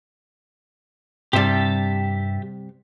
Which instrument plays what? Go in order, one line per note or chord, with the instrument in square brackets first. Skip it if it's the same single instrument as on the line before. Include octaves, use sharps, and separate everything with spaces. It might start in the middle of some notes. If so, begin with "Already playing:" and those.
[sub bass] G2 [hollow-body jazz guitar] C3 G3 [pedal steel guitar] G4 E5 A5